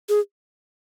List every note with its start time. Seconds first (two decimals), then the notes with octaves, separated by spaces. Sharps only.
0.09 G#4